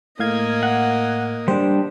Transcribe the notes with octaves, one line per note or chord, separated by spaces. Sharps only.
A2 A#3 D#5 F5 G#6
F#5
G3 D4 C5